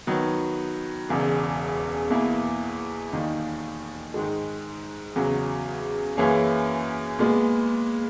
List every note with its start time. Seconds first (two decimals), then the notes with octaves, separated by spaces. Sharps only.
0.07 D#3 F#3 B3
1.09 E1 E2 C#3
2.10 E2 B2 A#3 E4
3.12 E1 D#2 D#3 A#3 D#4
4.14 G#2 D#3 G#3
5.16 E2 C#3 F#3
6.17 F#2 E3 A#3 C#4 G#4
7.19 A#2 G#3 B3